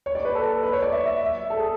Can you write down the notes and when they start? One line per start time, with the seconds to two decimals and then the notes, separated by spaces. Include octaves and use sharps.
0.06 C#5
0.15 D5
0.25 B4
0.35 A4
0.63 B4
0.73 C#5
0.82 D5
0.92 E5
1.06 E5
1.21 E5
1.50 A4
1.59 G#4